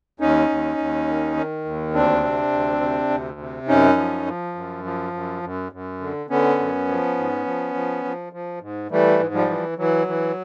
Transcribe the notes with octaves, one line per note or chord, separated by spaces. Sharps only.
D#2 C#4 D#4
D#2
D#2
D#3
D#3
D#2
D2 C4 D4
C3
D2
C3
D2
C3
F#2 C#4 D#4
F3
F3
F#2
F3
F#2
F#2
F#2
D3
D3 B3 C#4
F#2
F3
G#2
F3
F3
F3
F3
G#2
E3 G3 A3
G#2
F3 G3
E3
E3 F#3
E3